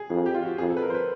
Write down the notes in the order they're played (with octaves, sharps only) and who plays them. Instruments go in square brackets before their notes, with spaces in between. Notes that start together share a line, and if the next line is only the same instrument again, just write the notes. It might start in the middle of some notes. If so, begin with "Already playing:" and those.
Already playing: [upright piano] G#4
[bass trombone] F2 [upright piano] G#4
[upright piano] G4
F4
F#4
[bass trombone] F2 [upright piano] G#4
[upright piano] A4
B4
A#4
C5
B4